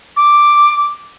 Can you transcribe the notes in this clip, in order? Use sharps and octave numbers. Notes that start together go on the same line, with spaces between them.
D6